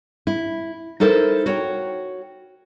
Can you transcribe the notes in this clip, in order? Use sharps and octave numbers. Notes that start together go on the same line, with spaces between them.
E4
D#4 E4 A4 A#4 C5
F#4 C#5 G5